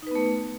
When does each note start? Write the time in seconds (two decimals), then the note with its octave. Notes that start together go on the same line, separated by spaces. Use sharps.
0.02 D#4
0.07 B4
0.11 B3
0.15 A3